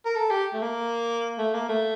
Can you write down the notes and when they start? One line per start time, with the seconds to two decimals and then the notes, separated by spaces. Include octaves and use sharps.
0.05 A#4
0.15 A4
0.31 G4
0.53 A3
0.62 A#3
1.38 A3
1.54 A#3
1.69 A3